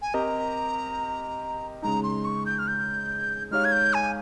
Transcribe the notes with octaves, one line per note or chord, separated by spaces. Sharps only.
G#5
C4 G4 A#4 D#5 A#5
C#3 G#3 D#4 A#5
C6
C#6
G6
F6
G6
G#3 D#4 G4 C#5 F5 F6
G#6
G6
G#5